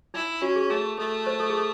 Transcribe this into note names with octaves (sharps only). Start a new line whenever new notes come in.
D#4 E4
C#4 F#4
G#4
A3 G#4
A3 A4
C5
A4
G#4
A4